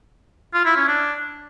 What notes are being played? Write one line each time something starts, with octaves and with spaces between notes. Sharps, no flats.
F4
E4
C#4
D4